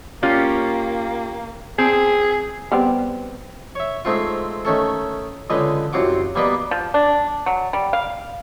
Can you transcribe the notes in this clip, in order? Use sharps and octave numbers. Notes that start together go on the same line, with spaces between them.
A#3 C#4 F4 G4
C4 G#4
G3 B3 C4
C#5 E5
G#2 G#3 A3 C4 F4
D#3 A3 C#4 A4
C#2 D3 G#3 B4 D#5
C2 F#2 C4 F4 F#5 D6
G3 A#3 B3 B4 D5 D#5
F3
D4
F#3
G3
F5